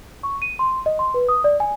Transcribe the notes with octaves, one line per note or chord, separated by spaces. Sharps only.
C#6
D#7
C6
D#5
C6
B4
D#6
D5
G#5